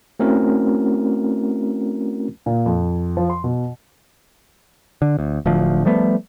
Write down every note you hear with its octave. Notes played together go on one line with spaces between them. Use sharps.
A3 C4 C#4 E4 F#4 A#4
A#2
F2
F3
C6
B2
D3
D2
D1 D2 F3
F3 G3 A3 B3